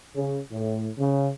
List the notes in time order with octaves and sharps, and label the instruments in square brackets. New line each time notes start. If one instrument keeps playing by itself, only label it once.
[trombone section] C#3
A2
C#3